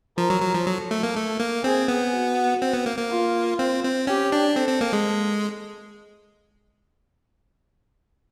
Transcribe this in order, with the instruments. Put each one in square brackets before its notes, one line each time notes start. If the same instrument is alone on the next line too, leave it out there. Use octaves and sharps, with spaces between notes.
[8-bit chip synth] F3 [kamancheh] A#4
[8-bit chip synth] F#3
F#3
F3
[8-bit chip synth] F#3 [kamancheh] A4
[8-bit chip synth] A3
A#3
A3
A#3
[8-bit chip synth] C4 [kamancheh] G#4
[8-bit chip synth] B3
[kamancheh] F#4
[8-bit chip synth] C4
B3
A#3
A#3
[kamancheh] F4
[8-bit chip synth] C4
C4
[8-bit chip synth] C#4 [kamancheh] G4
[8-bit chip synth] D4
[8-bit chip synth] C4 [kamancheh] A4
[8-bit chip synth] C4
A#3
G#3